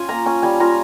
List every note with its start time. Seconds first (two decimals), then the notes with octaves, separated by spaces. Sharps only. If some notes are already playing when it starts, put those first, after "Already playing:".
Already playing: C#4 F4 G#5
0.09 A#3 A#5
0.26 C#4 G#5
0.43 G3 G#5
0.60 F4 A#5